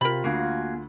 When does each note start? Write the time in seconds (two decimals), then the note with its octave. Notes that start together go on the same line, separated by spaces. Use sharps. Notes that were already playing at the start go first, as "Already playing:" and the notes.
0.01 C3 F4 A#4 B5
0.24 D2 D3 A#3 F#4 G#4